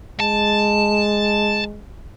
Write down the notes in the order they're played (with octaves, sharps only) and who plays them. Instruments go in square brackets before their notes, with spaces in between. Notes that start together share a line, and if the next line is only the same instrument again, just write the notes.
[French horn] G#3 [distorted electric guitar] A5